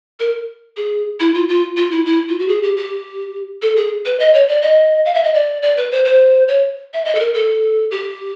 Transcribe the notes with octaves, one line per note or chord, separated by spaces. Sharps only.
A#4
G#4
E4
F4
F4
F4
E4
E4
F4
F#4
G#4
G4
G4
A4
G#4
B4
D#5
C#5
D5
D#5
F5
E5
D#5
D5
D5
B4
C5
C5
C#5
E5
D#5
A4
A#4
A4
G4